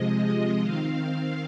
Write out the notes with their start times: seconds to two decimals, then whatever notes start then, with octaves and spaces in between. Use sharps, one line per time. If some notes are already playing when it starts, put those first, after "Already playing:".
Already playing: C3 F3 G#3 D#5
0.61 D#3 C4 F5